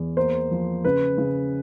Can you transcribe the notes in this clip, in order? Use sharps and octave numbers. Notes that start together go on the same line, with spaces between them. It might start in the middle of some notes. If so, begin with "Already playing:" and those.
Already playing: E2
A#3 C5
F3
C#3 B4
C#3